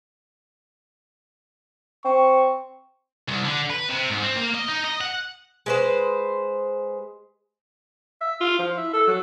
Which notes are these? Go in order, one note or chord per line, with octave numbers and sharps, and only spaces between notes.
C4 C#6
C2
D3
B4
C3
G#2
C4
A#3
D#5
D#4
D#5
F#5
G#3 B4 C5
E5
F4
F3
E4
A4
F#3